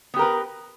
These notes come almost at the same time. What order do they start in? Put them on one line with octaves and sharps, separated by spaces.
B3 G4 A#4 B4